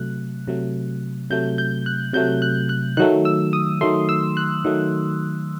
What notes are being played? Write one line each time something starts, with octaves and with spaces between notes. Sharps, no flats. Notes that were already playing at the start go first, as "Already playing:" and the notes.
Already playing: C3 F#3 A3 F#6
C3 F#3 A3
C3 F#3 A3 G6
G6
F#6
C3 F#3 A3 G6
F#6
F#6
D#3 F#3 A3 F#6
E6
D#6
D#3 F#3 A3 C6
E6
F#6
D#3 F#3 A3